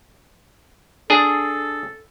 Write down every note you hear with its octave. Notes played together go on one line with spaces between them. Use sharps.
D4 G#4 A4